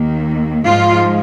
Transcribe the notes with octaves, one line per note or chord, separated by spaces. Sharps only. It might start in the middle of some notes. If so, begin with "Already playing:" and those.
Already playing: D#2 D#3 A#3
G#2 F3 G#3 F4